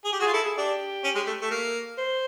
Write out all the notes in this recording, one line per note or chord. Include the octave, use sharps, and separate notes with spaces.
G#4
G4
F#4 G#4
F4
E4 A4
G#4
D4 G4
C#4
G#3
A3
A3
A#3
C5